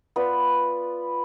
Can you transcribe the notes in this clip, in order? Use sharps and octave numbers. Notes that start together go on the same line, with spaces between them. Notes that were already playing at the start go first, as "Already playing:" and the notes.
B3 F4 B4 D5